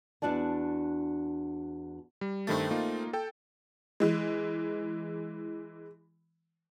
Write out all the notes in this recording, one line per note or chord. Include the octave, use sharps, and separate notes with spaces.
E2 F#3 D4 F#4 D5 A5
G3
G2 D#3 A3 C4 A6
A#3 D#4 F4
A4 G5
E3 G#3